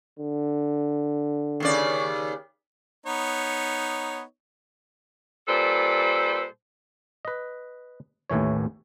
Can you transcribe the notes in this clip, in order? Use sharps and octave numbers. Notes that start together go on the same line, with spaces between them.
D3
D#2 C#3 D5
B3 D#4 C#5
A#2 G3 A4 B4 C5
B4 D#5
A1 D#2 A2 E3 C#5